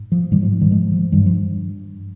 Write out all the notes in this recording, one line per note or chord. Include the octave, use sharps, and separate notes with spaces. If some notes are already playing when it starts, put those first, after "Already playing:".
Already playing: G#2
F3
G#2 D#3 G3
F3
F3
D#3 G3
F3 G#3
F3
G2 D#3 G3
F3